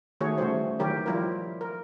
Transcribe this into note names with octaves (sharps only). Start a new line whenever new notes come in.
D#3 A3 F#4 G#4 C#5
C#3 E3 G3 A3 F#4 C5
D#3 E3 F#3 G4 A#4 C#5
F3 G3 E4 F4 A#4
A#4